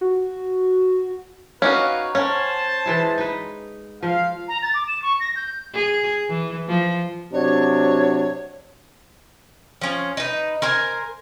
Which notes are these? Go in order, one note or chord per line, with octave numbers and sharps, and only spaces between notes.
F#4
C#4 D#4 F#4 B4 D5 F5
C#4 A#4 C5 C#5 F#5 A5
E3 G#3 E4
D#4 B4
F3 F5
A#5
A6
D6
E7
C#6
A#6
G6
G#4
E3
F3
C3 F#3 D4 C#5
F3 C#4
D#4 B4
A#4 C5 G#5